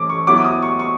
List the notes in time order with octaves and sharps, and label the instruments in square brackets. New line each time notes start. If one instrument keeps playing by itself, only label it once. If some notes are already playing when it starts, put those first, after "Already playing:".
Already playing: [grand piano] E3 A3 C#4 D6
C#6
F#3 B3 E4 D6
D6
D#6
C#6
C#6